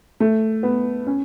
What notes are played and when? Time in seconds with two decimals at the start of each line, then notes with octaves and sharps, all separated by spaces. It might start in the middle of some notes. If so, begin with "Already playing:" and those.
0.20 A3
0.63 B3
1.07 C#4